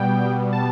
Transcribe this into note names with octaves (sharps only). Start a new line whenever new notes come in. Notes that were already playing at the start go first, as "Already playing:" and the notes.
Already playing: B2 G3 B3 G5
A5